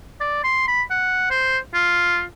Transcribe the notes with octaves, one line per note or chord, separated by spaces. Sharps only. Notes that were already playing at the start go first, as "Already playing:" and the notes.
D5
C6
B5
F#5
C5
F4